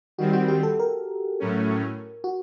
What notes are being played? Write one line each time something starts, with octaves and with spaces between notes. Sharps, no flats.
D#3 G3 C4 F#4
F#4
G4
A4
A#4
A2 F#3 A3 C#4
F#4